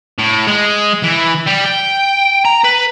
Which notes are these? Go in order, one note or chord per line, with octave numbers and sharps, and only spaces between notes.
A2
G#3
E3
G3
G5
A#5
B4